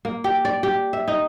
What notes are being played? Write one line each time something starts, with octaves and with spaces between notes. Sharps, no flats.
A#3
G4
D5
G4
E5
D#4